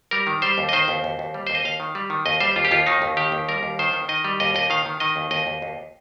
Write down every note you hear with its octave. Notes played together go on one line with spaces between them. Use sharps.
G3 A#4
D#3
G3 C5
D#2
D#5
D#3 C5
D#2
D#2
D#2
G3
D#2 C5
D#5
D#2 F5
D#3
G3
D#3
D#2 D#5
G3 C5
D#2 F4
G4
D#2 F4
D#3 D#4
D#2
D#3 G4
D#2
G3 A#4
D#2
D#3 C5
D#3
D#3 D#5
G3
D#2 D#5
D#2 D#5
D#3 F5
D#3
D#3 D#5
D#2
D#2 D#5
D#2
D#2